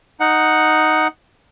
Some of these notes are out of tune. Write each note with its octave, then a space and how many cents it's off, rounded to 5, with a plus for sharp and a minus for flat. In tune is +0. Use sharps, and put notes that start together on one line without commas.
D#4 +0 F#5 +0